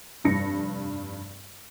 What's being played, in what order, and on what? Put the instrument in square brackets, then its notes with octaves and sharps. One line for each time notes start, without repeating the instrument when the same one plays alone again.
[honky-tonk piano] F1 G2 A#6 C#7